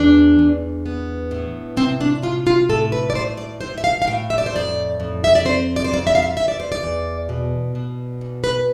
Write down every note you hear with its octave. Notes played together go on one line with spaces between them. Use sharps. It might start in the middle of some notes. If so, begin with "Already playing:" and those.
Already playing: E2 D4
E2
B3
A2
C3 C4
D4
C3 F4
F4
A2 A4
B4
D5
A2 C5
D5
A2 C5
E5
F5
F5
A2 G5
E5
D5
C5
F2 D5
F2
E5
D5
C4 C5
D5
C5
F2 D5
E5
F5
E5
E2 E5
D5
C5
D5
E2
B2
B2
E2
B4